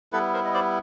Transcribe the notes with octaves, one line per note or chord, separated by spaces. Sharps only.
G3 B3 E4 A4 B4
A#4 C5
D#5
C5 D5